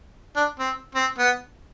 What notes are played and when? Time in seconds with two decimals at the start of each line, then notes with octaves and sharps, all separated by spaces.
0.36 D4
0.59 C4
0.95 C4
1.18 B3